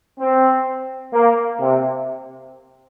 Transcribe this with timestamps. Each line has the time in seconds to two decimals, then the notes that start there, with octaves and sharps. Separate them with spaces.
0.19 C4
1.13 A#3
1.60 C3